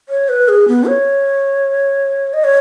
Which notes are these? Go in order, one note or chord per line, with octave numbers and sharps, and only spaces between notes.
C#5
B4
G#4
B3
C#5
D#5
C#5